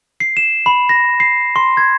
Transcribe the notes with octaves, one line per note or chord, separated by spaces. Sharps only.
C7
E7
B5
A#6
C7
C6
G#6